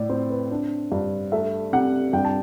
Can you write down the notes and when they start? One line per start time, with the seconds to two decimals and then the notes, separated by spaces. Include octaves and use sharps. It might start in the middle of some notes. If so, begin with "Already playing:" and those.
Already playing: A2 D5
0.09 C4 C5
0.30 B4
0.51 D4
0.92 G2
1.32 A3 E5
1.73 C3 F#5
2.13 G2 G5
2.25 A5